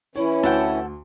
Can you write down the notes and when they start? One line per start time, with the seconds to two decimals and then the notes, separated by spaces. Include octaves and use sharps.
0.16 E3 C#4 E4 C#5
0.43 D2 A4 F#5 G5